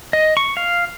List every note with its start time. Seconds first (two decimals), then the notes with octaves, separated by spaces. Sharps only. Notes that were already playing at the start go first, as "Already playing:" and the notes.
0.13 D#5
0.37 C#6
0.57 F5